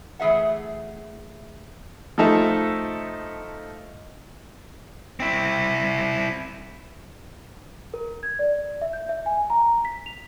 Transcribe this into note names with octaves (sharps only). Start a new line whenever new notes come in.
E3 A3 G#4 E5 F#5
F3 A3 D#4 A4 E5
C4 E4
A#4
G#6
D5
E5
G6
E5
G#5
A#5
B6
F7